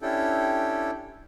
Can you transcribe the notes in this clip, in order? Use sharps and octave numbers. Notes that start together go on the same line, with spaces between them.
C#4 D4 E4 G4 A4 G5